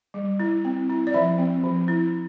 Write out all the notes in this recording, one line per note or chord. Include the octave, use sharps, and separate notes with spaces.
G3
E4
C4
E4
D5
F3 E5
C4
F3
E4